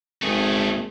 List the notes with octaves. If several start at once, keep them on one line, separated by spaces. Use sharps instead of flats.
G#1 A3 G#4